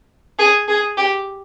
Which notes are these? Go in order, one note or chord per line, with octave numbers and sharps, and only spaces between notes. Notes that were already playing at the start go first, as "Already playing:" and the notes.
G#4
G#4
G4